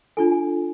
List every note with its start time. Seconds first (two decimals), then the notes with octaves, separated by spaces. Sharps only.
0.17 D4 F4 A4 G#5
0.32 G#5